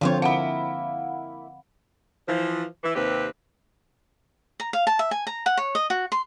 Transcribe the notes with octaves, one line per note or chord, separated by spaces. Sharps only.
D3 F3 C4 F4 G4 C#5
A#3 E4 F5 F#5 B5
E3 F3
E3
D#2 C3 C4 G4 B4
A#5
F5
A5
E5
G#5
A#5
F#5
C#5
D#5
F#4
C6